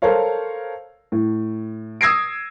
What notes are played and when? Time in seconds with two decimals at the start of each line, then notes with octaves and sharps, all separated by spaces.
0.02 A4 A#4 C5 C#5 F5
1.12 A2
2.01 D#6 E6 G#6 A#6 C7 D7